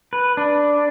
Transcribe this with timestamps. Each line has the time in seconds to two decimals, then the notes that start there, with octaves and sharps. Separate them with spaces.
0.13 B4
0.37 D4